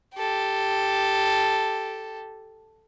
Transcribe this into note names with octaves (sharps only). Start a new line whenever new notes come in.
G4 A4